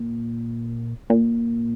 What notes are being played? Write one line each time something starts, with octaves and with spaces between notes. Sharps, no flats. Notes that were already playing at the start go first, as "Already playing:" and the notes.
Already playing: A#2
A#2